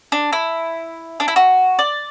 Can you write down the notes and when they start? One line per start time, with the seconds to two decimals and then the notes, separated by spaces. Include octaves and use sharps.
0.12 D4
0.33 E4
1.20 D4
1.28 E4
1.36 F#4
1.79 D5